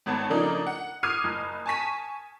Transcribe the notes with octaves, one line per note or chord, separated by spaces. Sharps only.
G#1 B3 C#5 A5
C#3 F3 A3 A#3 D4 D#4
F#5
D6 D#6 F6 G#6 C7 D#7
F#1
G#5 A5 C#6 B6 D#7